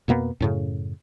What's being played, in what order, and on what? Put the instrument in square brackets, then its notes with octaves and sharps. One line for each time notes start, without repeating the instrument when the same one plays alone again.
[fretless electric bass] F2 B2 A#3 B3
F#2 A2 C#3